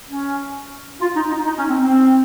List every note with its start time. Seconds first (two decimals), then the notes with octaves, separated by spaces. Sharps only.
0.08 C#4
1.00 F4
1.15 D#4
1.30 D#4
1.45 D#4
1.57 C#4
1.69 C4
1.80 C4